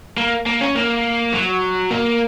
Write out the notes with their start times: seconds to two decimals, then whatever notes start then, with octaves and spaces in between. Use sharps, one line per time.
0.18 A#3
0.46 A#3
0.61 C#4
0.76 A#3
1.34 F#3
1.91 A#3